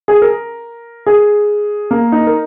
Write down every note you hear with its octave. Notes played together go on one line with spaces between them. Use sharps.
G#4
A#4
G#4
A#3
D#4
A#4